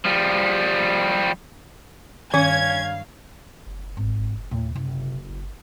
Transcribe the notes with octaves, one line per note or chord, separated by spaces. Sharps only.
F3 G3
G2 D#3 C#4 F5 G#6
F#1
G#1
D#2 A2
F#1 C3 E4
G1